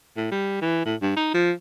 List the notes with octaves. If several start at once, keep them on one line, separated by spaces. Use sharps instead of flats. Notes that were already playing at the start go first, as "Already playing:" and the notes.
A2
G3
E3
A2
G2
D#4
F3